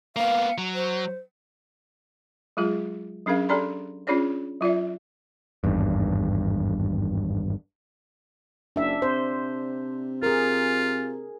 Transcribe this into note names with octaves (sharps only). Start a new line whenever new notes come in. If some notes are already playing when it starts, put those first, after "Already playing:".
A#3 B3 F5
F#3
C5
F#3 G#3 F4 G#4
F#3 C#4 D4 G#4 A#4 F5
D4 G4 A4 D5 A#5 C6
C#4 D4 F4 G#4 C#5 D5
F#3 F4 D5 E5
G#1 E2 G2
F#1 D4 E5
C3 C5
F4 G#4 A#4